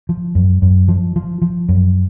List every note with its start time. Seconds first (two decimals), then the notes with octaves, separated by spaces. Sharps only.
0.09 F3
0.35 F#2
0.62 F#2
0.88 F3
1.16 F3
1.42 F3
1.69 F#2